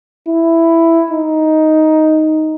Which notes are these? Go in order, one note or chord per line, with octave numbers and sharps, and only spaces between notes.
E4
D#4